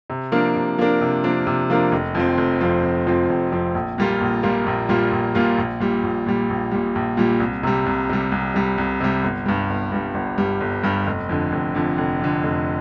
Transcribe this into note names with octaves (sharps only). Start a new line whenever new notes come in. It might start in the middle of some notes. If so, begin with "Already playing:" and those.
C3
F3 A#3 D4 A#4
C3
F3 A#3 D4 A#4
C3
F3 A#3 D4 A#4
C3
F3 A#3 D4 A#4
F1
F2 F3 C4
F1
F2 F3 C4
F1
F2 F3 C4
F1
F2 F3 C4
A#1
A#2 G3 A#3 F4
A#1
A#2 G3 A#3 F4
A#1
A#2 G3 A#3 F4
A#1
A#2 G3 A#3 F4
A#1
A#2 G3
A#1
A#2 G3
A#1
A#2 G3
A#1
A#2 G3
C2
C3 G3
C2
C3 G3
C2
C3 G3
C2
C3 G3
G1
G2 G3
G1
G2 G3
G1
G2 G3
G1
G2 G3
F1
F2 D3
F1
F2 D3
F1
F2 D3
F1